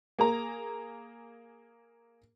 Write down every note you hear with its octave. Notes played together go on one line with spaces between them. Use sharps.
A#3 G#4 A#5